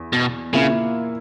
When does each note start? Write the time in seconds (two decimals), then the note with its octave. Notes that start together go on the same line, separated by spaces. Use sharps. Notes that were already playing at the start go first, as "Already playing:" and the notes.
Already playing: E2
0.13 B2
0.53 A#2 C#3 A#3 E4